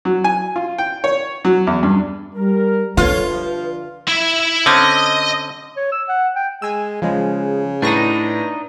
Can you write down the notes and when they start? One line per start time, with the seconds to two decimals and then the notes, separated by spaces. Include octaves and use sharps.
0.05 F#3
0.24 G#5
0.56 F4
0.78 G5
1.04 C#5
1.45 F#3
1.67 E2
1.83 G2
2.36 G3 A#4
2.97 D3 F4 A4 B4 C#5
3.29 G2 F3
4.08 E4 E5
4.66 D3 C4 C#4 D#5
5.77 C#5
5.92 E6
6.09 F#5
6.36 G5
6.62 G#3 G#5 E6
7.02 C#3 F3 G#3
7.82 A2 D4 D#4 B4 C#6 A#6